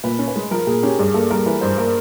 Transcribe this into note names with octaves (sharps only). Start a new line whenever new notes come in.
A#2 B4
C#4
B4
G#3
F3 A#4
A#2 G#4
C#4 G4
G2 G#4
A#3 A4
G3 A#4
E3 B4
G2 C5
A#3 A#4